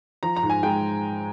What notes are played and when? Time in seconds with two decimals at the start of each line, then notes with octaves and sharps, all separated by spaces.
0.23 F3 A#5
0.36 A#5
0.43 G#2
0.50 G#5
0.63 G#3 G5